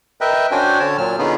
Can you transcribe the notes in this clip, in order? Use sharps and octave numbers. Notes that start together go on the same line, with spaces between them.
A#4 B4 D#5 E5 G5
C#4 D4 F#4 C5 G5 G#5
D3 C#5 A5
A#2 F#3 F6
D3 B3 C#4 D#4 F4 G#4